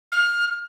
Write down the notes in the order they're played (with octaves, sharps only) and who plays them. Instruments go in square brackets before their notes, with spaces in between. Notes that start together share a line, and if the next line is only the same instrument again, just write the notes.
[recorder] F6